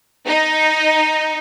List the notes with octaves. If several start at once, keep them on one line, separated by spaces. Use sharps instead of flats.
D#4